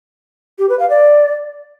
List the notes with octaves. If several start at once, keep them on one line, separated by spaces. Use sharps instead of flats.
G4
B4
F5
D5